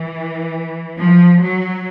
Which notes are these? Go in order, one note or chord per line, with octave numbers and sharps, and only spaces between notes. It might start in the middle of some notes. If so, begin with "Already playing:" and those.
Already playing: E3
F3
F#3